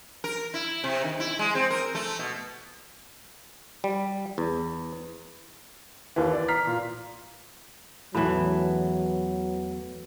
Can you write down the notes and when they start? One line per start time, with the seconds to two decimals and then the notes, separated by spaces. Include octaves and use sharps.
0.24 A#4
0.54 E4
0.84 C3
1.04 D#3
1.20 E4
1.39 G#3
1.55 C4
1.70 A#4
1.95 A3
2.19 B2
3.84 G3
4.38 E2
6.16 D#2 E3
6.33 D5
6.48 A#5 F6 B6 C7
6.67 A#2
8.15 E2 A2 E3 F#3 A5 B5